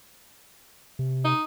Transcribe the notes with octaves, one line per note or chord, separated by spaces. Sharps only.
C3
D#4